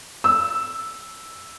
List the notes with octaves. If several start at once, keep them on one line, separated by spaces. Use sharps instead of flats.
E6